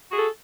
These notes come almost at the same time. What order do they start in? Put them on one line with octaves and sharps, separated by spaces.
F#4 G#4 A4